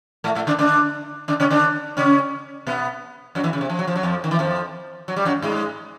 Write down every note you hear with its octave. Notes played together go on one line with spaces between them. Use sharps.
A2 A3
A2 A3
D3 D4
D3 D4
D3 D4
C#3 C#4
D3 D4
C#3 C#4
B2 B3
F#2 F#3
E2 E3
C#3
C3
F3
F#3
F3
F#3
F2 F3
D#3
E3
F2 F3
F#3
G3
F#2 F#3
G#2 G#3